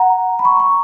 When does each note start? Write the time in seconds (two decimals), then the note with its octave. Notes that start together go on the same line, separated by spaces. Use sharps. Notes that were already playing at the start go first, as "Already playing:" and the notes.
Already playing: F#5 A#5
0.39 B5
0.45 A#5 C#6
0.60 A#5 C#6